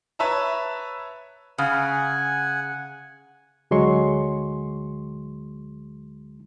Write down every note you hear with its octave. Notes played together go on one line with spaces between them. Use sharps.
B4 C#5 E5 A5 A#5
C#3 F#5 G#5
D2 D3 F#3 G#3 C6 C#6